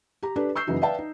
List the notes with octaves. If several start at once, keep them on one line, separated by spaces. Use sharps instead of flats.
G4 A#5
D4 G4 A4 B4
C#6 E6 G6 C7
F#1 C#3 E3 D#4 F#4
B4 D5 E5 F5 G5 A5
D#4